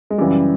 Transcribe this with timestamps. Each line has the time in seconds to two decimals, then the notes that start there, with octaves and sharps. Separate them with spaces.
0.10 G#3
0.18 F#2 C#3 E3 G3